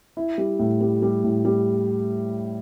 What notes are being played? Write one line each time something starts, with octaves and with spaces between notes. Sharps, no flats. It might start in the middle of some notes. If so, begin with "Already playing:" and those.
E4
G3
A2
G3
G3
A2
G3